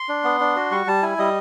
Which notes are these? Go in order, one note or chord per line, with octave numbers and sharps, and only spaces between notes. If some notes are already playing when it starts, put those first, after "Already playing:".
Already playing: C6
D4
B3
D4
F#4
G3 C#6
G3 A5
E4 G#5
G3 D#5